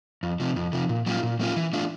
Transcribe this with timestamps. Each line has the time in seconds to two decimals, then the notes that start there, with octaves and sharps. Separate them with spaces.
0.23 F2
0.40 C3 F3
0.56 F2
0.73 C3 F3
0.89 A#2
1.06 F#3 A#3 C#4 F4
1.23 A#2
1.39 F#3 A#3 C#4 F4
1.56 E3
1.73 A3 D4 F4